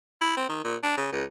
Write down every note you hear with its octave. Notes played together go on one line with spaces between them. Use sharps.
E4
C4
D#3
A#2
D4
C#3
C#2